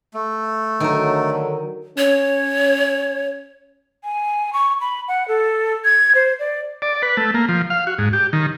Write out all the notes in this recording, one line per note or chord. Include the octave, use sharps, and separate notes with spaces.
A3
D3 D#3 F#3 A#4
C#4 C#5
G#5
C#6
B5
F#5
A4
G#6
C5
D5
D5
B4
A3
A#3
F3
F5
F#4
G#2
G4
D#3